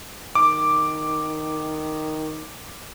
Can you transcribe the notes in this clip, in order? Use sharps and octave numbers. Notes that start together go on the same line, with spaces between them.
D#3 D6